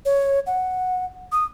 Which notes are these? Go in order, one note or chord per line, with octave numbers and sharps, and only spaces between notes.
C#5
F#5
D#6